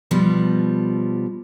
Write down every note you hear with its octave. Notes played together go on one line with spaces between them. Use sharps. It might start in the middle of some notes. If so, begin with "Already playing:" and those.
B2 F3 G3